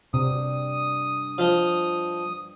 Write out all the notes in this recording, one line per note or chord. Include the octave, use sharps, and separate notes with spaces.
G2 C3 D#6
F3 D#5